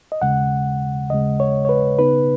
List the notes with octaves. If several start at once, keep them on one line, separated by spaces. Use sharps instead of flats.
D#5
D#2 C#3 G#3 F#5
D#2 C#3 G#3 D#5
C#5
C#5
B4
C#3 B3 D#4 B4